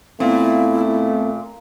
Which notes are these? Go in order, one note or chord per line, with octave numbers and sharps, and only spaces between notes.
A#2 A3 B3 C4 E4